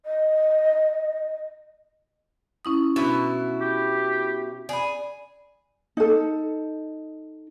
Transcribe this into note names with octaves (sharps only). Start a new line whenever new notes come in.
D#5
C#4 E4 D#6
B2 F#3 D4 E4
G4
G#4 D5 B5
D#4 A4